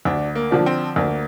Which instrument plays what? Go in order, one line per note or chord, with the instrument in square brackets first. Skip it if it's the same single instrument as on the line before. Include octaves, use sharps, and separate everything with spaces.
[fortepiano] D2 [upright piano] D4
[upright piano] A#3
[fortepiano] D3 F3 D4
[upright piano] C4
[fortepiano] D2 [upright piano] A#3